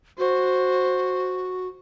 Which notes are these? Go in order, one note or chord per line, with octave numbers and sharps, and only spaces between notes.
F#4 C5